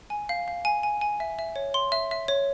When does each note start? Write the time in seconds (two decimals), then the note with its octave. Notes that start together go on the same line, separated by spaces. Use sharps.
0.10 G#5
0.29 F5
0.48 F5
0.65 G#5
0.83 G#5
1.01 G#5
1.20 E5
1.39 E5
1.56 C#5
1.74 C6
1.92 E5
2.11 E5
2.28 C#5